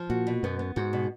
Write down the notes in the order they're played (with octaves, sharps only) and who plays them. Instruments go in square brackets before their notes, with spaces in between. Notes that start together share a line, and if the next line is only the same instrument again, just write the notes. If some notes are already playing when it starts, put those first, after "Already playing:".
Already playing: [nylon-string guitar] F3
[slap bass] A#2 [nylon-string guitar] F#4
[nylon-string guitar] B2
[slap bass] F#2 [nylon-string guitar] B3
[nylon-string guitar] B3
[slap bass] G#2 [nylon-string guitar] F#4
[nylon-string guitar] B2